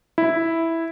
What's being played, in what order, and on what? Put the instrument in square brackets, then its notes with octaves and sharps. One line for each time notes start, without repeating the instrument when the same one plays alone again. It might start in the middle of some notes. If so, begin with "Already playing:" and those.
[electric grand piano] E4